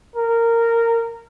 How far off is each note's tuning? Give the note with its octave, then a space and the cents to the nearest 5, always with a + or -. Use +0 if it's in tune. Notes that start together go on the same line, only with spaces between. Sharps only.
A#4 -15